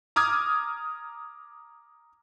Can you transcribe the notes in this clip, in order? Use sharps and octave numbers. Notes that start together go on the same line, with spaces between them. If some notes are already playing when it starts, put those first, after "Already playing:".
A#5 D6 D#6 F6 G#6